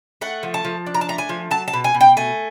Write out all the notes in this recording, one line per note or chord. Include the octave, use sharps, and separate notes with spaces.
A3 F#5
F3
A5
F3
D4
A#5
A5
A3 A#5
G#5
F3
F#3 A5
A5
B2
G#5
B2
G5
A3 G#5